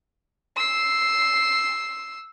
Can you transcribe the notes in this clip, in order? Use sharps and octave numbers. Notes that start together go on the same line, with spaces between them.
E6 C7